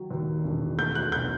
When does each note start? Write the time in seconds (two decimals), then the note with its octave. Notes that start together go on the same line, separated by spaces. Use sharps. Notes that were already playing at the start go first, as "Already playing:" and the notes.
Already playing: D#3 F#3
0.11 D#2
0.44 E1
0.78 A3 G6
0.95 F#6
1.12 B1 G6